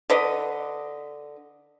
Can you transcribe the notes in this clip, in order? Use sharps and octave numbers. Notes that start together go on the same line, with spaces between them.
D3 B4 D#5